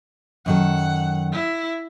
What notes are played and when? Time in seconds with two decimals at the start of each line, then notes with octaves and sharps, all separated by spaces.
0.46 F#2 D#3 A4 F#5
1.33 E4